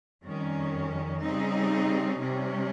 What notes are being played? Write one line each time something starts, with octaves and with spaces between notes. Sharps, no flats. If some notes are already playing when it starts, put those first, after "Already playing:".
F2 D#3 G3 C#4
C#3 G3 C4 D#4
C3 G3 C#4